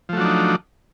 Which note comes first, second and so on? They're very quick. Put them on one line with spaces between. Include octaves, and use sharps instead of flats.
F3 A3 F#3 D4 D#4